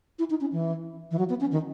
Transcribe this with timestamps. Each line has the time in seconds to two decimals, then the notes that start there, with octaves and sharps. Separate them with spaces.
0.19 E4
0.30 D#4
0.41 C#4
0.52 E3
1.11 E3
1.19 F#3
1.29 B3
1.40 C#4
1.52 D#3